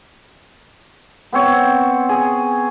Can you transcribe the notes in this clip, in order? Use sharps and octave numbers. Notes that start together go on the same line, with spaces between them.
B3 C4 C#5
G#4